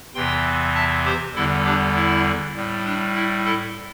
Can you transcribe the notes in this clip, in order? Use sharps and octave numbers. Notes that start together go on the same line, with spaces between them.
E2 C3 E3 G5 C6
E5 A5
G4 C5
E2 D3 G3 E4 A4
D4 G4
E4
A2 G3
D4
E4
E4 A4